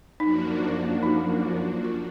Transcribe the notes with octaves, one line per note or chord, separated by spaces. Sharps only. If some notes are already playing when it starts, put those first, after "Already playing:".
F#2 F3 A#3 D4 D#4 F#4
D#4
F4